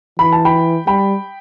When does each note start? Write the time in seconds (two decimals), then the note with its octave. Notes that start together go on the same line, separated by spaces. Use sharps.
0.19 E3 B5
0.33 A5
0.45 G5 B5
0.87 G3 G5 B5